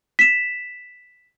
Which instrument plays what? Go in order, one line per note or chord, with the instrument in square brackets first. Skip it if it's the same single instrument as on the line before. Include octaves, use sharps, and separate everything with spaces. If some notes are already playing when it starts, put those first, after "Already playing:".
[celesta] B6 E7